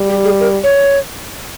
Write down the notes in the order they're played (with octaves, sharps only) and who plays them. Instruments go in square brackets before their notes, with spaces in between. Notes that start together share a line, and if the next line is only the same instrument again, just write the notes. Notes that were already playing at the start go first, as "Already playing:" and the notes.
Already playing: [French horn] G3
[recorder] G4
G#4
A#4
C#5